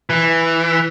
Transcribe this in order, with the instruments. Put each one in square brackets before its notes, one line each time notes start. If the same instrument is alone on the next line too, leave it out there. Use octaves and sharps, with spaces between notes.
[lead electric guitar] E3